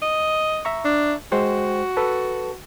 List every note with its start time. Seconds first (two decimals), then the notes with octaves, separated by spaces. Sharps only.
0.02 D#5
0.65 E5 A#5 C#6
0.85 D4
1.32 G#3 F#4 C5 G5
1.97 A4 B4 A5